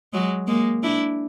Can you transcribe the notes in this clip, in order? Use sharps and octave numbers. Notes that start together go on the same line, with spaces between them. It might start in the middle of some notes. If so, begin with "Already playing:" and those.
F#3 G#3
G#3 A#3
D4 E4